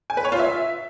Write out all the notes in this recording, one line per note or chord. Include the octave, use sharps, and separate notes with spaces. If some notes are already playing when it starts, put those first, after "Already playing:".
G#5
B4
C#5
F4
E5